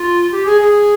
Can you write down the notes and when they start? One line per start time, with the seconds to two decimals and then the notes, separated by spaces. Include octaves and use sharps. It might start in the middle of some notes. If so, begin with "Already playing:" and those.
Already playing: F4
0.32 G4
0.46 G#4
0.61 G#4